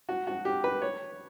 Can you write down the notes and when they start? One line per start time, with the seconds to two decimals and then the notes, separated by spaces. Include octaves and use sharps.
0.09 F#4
0.27 F#4
0.45 G4
0.64 B4
0.82 C#5